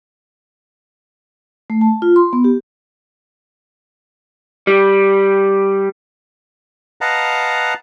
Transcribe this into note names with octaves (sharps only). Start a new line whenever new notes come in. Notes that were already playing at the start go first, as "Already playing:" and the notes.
A3
A5
F4
C6
B3
G4
G3
B4 D#5 F5 F#5 A5 A#5